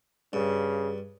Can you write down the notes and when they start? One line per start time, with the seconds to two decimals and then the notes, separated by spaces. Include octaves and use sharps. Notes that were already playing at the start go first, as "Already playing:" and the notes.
0.33 G2 C#3